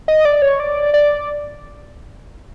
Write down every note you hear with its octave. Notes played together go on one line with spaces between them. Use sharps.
D#5
D5
C#5
D5
D5